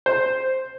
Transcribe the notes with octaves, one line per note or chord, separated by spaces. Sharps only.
C5